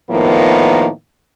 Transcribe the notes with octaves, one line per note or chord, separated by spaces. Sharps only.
A2 D#3 F3 A#3 B3